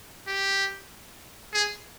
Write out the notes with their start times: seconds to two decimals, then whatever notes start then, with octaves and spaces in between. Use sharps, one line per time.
0.28 G4
1.53 G#4